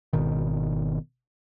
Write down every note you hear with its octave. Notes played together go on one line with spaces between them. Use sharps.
G#1 B2 D#3